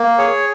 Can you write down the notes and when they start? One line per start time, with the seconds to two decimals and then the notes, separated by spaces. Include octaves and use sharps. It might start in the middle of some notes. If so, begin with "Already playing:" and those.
Already playing: A#3
0.18 G#4 C#5